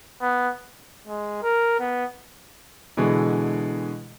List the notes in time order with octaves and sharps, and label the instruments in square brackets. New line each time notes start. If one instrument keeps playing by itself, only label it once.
[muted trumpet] B3
[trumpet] G#3
A#4
B3
[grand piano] B2 D3 E3 G#3